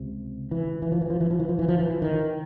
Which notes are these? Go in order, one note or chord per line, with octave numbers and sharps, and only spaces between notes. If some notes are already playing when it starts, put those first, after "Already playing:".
Already playing: C#2 C3
E3
E3
F3
E3
F3
E3
F3
E3
F3
E3
F3
E3
D#3